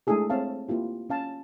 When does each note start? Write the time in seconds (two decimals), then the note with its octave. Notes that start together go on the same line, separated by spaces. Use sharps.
0.07 G#3 A3 D4 E4 G#4 A4
0.30 C4 C#5 E5 F5 A5
0.68 A#3 E4 F4 G4
1.10 C#4 F5 A5